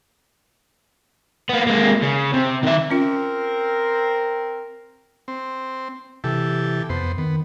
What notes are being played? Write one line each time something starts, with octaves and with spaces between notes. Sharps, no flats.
A#3 B3
G#3 A#3
C#3
C3
D#3 E5
C4 C#4 F4 A#4
C4
C3 E3 G4 A4
F2 B3 C5
D#3 B3